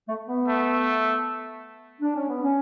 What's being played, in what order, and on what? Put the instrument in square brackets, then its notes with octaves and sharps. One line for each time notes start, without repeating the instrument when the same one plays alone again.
[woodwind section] A3
B3
[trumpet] A3
[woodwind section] D4
C#4
B3
C#4